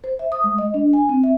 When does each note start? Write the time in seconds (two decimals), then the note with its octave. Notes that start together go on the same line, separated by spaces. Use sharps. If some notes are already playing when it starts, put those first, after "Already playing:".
0.04 C5
0.19 E5
0.32 D#6
0.44 G#3
0.58 D#5
0.74 D4
0.93 G#5
1.09 C4
1.24 E5